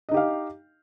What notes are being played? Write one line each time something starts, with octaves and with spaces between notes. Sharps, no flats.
D#4 G4 D#5 F5